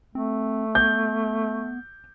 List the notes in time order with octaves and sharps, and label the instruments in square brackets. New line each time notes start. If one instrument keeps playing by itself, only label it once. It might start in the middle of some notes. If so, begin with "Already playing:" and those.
[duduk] A3 [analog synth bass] C4
[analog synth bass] B3 [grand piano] G6